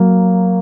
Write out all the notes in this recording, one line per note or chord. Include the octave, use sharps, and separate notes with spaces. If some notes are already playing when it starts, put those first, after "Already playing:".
Already playing: F#3 A#3